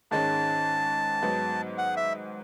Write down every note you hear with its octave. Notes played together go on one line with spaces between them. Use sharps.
G#2 D#3 G#3 C#4 A5
G#2 F#3 B3
F#5
E5